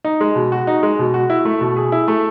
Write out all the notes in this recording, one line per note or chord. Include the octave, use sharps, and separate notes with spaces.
D#4
G#3
B2
F#4
D#4
G#3
B2
F#4
E4
A3
B2
G#4
E4
A3